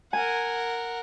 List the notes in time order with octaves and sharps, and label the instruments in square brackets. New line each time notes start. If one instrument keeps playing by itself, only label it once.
[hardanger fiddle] A#4 F#5 [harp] G#5